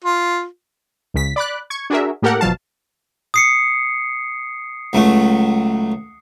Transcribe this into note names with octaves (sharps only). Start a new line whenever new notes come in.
F4
C#2 C#3 B6
D5 B5 D6 F#6
C#6 G#6
D4 F#4 G#4 A#4 E5
A2 A#3 G4 A4 A#4 F#5
G1 B2 F3 F#3 F5 A5
D#6 C7 C#7
C#2 F#3 A3